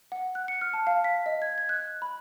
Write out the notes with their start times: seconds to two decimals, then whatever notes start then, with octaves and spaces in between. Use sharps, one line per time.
0.12 F#5
0.35 F#6
0.48 C#7
0.61 F6
0.73 A5
0.87 F5
1.04 B6
1.26 D#5
1.42 G#6
1.58 G#6
1.69 F#6
2.02 B5